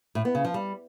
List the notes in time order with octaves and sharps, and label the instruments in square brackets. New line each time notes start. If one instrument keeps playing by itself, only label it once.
[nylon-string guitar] A2
B3
C#3
F3
G3